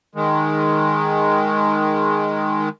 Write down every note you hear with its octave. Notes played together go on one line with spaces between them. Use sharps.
D#3 G#3